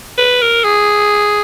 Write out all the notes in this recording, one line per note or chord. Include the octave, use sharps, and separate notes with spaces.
B4
A#4
G#4